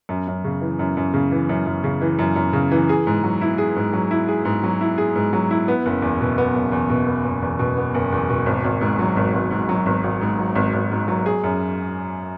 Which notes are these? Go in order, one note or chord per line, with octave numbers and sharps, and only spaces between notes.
F#2
F#2
C#3
E3
F#2
F#2
C#3
E3
F#2
F#2
C#3
E3
F#2
F#2
C#3
E3
G#4
G#2
F#3
E4
G#4
G#2
F#3
E4
G#4
G#2
F#3
E4
G#4
G#2
F#3
E4
B3
F#1
E2
B2
B3
F#1
E2
B2
B3
F#1
E2
B2
B3
F#1
E2
B2
G#1
G#1
G#2
F#3
G#1
G#1
G#2
F#3
G#1
G#1
G#2
F#3
G#1
G#1
G#2
F#3
G#4
F#2